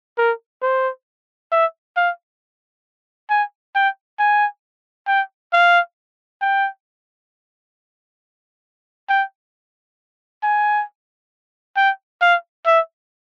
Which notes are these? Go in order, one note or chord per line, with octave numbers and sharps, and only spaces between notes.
A#4
C5
E5
F5
G#5
G5
G#5
G5
F5
G5
G5
G#5
G5
F5
E5